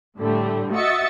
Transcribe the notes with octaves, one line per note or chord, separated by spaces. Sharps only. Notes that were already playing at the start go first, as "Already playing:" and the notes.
A2 D3 G3 A3
F#4 D#5 E5 A6 C#7